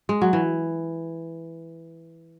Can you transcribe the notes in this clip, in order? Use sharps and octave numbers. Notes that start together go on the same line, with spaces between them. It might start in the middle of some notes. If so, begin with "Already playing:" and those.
G#3
F#3
E3